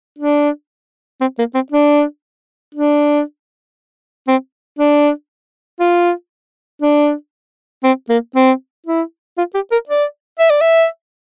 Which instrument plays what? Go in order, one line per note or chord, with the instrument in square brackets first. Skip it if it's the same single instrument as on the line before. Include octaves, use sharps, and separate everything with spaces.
[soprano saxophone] D4
C4
A#3
C4
D4
D4
C4
D4
F4
D4
C4
A#3
C4
E4
F4
G4
A#4
D5
E5
D5
E5